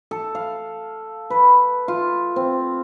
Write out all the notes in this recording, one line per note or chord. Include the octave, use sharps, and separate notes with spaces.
A4
F5
B4
F4
C4